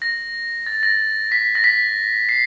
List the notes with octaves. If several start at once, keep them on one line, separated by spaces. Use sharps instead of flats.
A#6
A6
A#6
B6
A#6
B6
C7